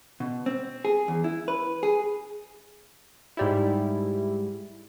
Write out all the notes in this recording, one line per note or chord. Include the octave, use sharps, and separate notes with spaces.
B2
C4
G#4
E2
E4
B4
G#4
G#2 G3 E4